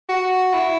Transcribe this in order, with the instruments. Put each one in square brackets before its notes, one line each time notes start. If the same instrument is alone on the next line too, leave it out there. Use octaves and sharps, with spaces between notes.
[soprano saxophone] F#4
E4